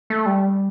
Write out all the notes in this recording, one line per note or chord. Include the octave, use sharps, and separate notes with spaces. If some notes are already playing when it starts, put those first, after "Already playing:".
A3
G3